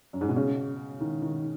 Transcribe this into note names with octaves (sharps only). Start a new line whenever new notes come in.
F#2
G#2
B2
C#3
D#3
D#3